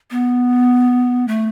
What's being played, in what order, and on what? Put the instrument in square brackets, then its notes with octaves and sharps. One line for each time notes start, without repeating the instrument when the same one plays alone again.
[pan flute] B3
A3